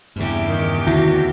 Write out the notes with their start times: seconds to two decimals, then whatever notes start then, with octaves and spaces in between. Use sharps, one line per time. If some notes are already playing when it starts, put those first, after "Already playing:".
0.16 E2 G2 C#3 G4
0.46 D#3
0.87 D2 C3 D#3 E4 F#4 G6